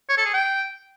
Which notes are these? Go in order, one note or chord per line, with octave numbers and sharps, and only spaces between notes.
C#5
A4
G#4
G5